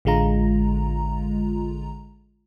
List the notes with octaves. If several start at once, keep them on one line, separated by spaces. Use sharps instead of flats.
A1 D3 G#3 F4 A#5